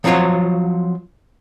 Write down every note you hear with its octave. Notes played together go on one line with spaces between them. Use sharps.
F3 F#3 C4 F4 F#4 C#5